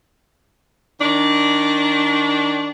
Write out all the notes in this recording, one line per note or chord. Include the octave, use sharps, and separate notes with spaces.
D#3 D4